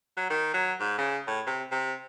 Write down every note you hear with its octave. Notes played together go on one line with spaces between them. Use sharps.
F#3
D#3
F#3
G#2
C#3
A2
C3
C3